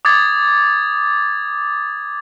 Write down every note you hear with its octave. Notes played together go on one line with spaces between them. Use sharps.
D6 D#6 G#6 A6